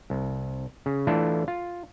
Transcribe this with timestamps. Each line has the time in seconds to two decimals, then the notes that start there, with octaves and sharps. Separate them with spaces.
0.10 C2
0.86 C#3
1.07 E3 A3 D4 E4 F4 A4
1.48 F4